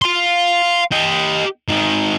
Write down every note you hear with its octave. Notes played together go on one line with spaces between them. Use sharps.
F5 C6
G4 D#5
G#2 D#3